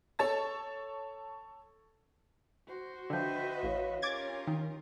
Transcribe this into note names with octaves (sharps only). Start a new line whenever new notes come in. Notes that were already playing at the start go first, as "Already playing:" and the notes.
A4 C#5 A5 A6
F#4 C5
D3 F3 B4 D#5 E5 G5 G6
A1 C#5 F5
C#4 F4 G4 A#4 D6 G#6 A6
D#3